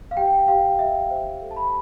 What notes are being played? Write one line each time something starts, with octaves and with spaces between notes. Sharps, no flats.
F5
G4 G5
G4 F5
G4 E5
C5
A4
A5
B5